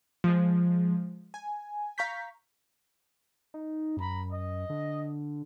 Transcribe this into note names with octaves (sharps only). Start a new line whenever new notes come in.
F3 G#3
G#5
F5 A#5 C#6 G6 B6
D#4
F#2 A#5 B5
D#5
D3